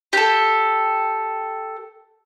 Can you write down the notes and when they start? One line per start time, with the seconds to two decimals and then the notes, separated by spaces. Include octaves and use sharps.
0.13 G4 A4